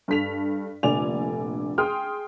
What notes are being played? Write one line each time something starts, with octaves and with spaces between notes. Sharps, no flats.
G2 A4 B6 F7
F1 A#1 D3 D5 G#5 F7
G#4 G5 C6 D#6 F6